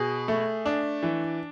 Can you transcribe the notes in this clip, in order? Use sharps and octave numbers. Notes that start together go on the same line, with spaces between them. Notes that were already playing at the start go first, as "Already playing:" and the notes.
Already playing: B2 G#4
A3
D4
E3